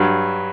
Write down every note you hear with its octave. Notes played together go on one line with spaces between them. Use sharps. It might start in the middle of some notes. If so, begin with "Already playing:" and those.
Already playing: G2 F#3